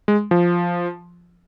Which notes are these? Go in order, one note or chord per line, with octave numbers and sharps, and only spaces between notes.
G#3
F3